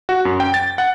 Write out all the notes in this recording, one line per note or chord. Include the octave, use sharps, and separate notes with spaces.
F#4
F#2
G5
A6
F#5